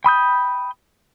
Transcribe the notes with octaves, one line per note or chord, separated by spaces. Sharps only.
G5 B5 D#6 G6